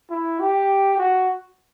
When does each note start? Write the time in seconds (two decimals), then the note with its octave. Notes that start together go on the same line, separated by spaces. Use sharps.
0.10 E4
0.40 G4
0.98 F#4